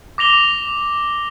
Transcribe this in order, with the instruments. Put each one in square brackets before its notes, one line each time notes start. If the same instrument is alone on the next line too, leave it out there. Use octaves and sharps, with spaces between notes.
[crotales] D6 A#6 F7 G7